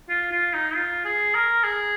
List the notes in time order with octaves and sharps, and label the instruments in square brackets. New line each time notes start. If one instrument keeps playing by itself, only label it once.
[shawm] F4
F4
D#4
F4
G#4
A#4
G#4